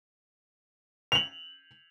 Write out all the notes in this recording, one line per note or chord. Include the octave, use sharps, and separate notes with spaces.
F7 F#7